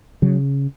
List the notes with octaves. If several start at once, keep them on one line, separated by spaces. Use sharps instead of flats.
C#3 F#3